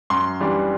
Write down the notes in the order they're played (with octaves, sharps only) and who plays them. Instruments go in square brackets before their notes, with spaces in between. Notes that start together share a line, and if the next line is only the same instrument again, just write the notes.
[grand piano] F#2 C6
E3 G3 D4